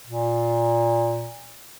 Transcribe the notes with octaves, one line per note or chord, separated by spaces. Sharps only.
A#2